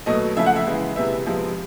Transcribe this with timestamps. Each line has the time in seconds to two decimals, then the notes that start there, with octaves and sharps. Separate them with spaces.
0.06 B2 F#3 A3 D#5
0.36 C#3 F3 A3 E5
0.46 F#5
0.56 E5
0.67 C#3 E3 G#3
0.96 C3 E3 G#3 B3 E5
1.26 C3 F3 G#3 B3